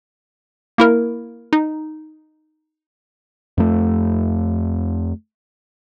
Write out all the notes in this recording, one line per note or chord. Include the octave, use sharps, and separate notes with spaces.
A#3 E4 A#4
D#4
F2 A3